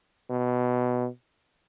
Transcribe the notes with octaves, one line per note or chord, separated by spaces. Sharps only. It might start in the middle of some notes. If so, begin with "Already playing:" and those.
B2